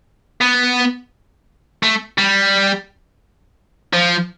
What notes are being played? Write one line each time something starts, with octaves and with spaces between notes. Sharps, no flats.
B3
A3
G3
F3